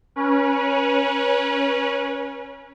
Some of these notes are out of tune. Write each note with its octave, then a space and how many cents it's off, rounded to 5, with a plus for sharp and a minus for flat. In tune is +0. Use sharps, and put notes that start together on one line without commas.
C#4 +0 B4 -35